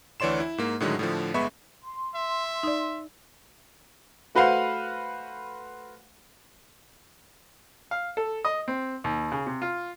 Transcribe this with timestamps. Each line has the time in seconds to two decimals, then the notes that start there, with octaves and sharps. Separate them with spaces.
0.20 D2 E3 C#5 D5 C6 E7
0.40 E4
0.58 G#2 A#3
0.80 A2 D3 D#3 F#3 G#3
0.99 A2 D3 F3
1.34 G1 G#3 B3 E5 B5 C#6
1.83 C6
2.15 E5
2.63 D#4 D5
4.35 A3 F#4 B4 C5 F5 F#5
7.91 F5
8.17 A4
8.45 D#5
8.68 C4
9.04 D#2
9.32 C#3
9.47 C3
9.62 F4